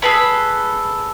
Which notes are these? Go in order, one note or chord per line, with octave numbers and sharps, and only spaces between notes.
G#4 A4 B4 B5